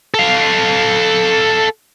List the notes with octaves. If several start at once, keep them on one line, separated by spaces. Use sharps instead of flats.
A4 F5